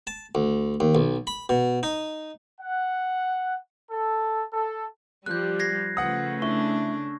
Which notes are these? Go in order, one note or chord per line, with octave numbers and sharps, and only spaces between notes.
A5
D2
D#2
B1
B5
B2
D#4
F#5
A4
A4
F3 G3 F#6 G6
G#6 A#6 C7
C#3 F3 A3 B4 F#5 D#6
D4 E4 C#6